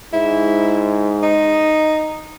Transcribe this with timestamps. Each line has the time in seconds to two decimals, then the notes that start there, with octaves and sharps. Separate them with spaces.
0.13 G#2 E4
1.23 D#4